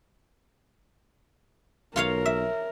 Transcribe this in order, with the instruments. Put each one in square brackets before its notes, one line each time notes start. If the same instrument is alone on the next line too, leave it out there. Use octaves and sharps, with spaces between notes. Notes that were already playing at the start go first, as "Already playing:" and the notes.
[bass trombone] B1 [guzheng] F4 C#5 F5 [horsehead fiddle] A#4
[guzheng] E5